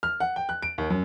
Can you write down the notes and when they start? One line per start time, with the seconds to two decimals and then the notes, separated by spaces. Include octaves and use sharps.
0.03 F6
0.20 F#5
0.36 G5
0.49 F#6
0.62 D7
0.78 D#2
0.90 F#2